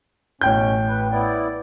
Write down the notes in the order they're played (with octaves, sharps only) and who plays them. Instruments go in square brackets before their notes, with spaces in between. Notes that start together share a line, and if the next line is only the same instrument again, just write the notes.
[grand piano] A1 G5 G6 [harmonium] B2 C#4
[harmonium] B4
B3 E4 D5